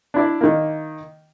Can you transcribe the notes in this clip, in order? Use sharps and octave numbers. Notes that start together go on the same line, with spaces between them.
D4 E4 D5
D#3 A#3